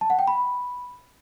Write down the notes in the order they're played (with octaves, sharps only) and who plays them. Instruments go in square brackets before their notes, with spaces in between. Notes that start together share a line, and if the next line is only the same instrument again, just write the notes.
[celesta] A5
F#5
G5
B5